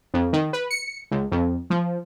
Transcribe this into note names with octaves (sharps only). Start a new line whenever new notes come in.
F2
D#3
B4
C#7
C#2
F2
F3